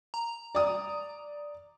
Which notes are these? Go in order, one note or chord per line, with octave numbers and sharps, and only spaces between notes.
A#5
D5 D#6